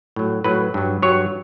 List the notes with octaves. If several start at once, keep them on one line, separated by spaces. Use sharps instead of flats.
A2 F#3
A2 F#3 B4
G2 F#3
G2 F#3 C#5